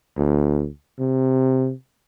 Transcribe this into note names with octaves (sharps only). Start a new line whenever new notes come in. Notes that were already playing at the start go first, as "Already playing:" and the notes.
D2
C3